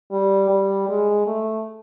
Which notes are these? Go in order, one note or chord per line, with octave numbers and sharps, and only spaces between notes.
G3
G3
G#3
A3